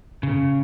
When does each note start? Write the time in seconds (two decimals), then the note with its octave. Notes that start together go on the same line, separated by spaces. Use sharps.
0.23 C#3